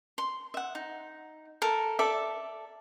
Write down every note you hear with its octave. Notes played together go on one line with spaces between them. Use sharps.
C6
E5 F#5
D#4
A4 A#4 E5
A4 D5 E5